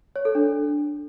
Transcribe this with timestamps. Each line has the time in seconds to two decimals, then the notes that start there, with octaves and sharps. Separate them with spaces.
0.16 C#5
0.25 A4
0.35 D4